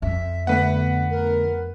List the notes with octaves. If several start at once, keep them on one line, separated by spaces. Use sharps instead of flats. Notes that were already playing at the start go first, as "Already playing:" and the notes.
F2 E5
D3 A3 B3 B4 F#5
A#4